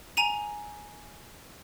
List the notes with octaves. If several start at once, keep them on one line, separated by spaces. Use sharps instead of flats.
G#5 A#5 D#7 F7